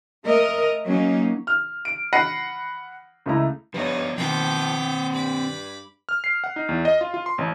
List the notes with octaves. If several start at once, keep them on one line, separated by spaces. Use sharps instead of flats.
A3 A#4 D#5
F#3 A#3 C#4 D#4
F6
D7
F#5 B5 A#6 C7 D#7
C#2 A3 E4 A#5
G2 F3 B3 D#4 B4 C#5
B2 D#3 F3 C4 B4 G5 D6
G2 B5 D6
F6
C7
F#5
D#4
E2
D#5
F4
F4
C6
A1